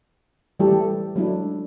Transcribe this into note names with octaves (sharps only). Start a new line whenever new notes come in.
E3 G3 A3 E4 G4 A4
A3
F#3 G#3 A3 D4 E4